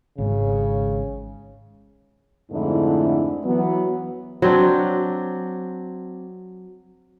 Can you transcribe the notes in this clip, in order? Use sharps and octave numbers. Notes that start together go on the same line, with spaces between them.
G#1 G#2 C#3
F2 G#2 D3 A3 D4 E4
E3 F#3 B3
F#3 C4 D4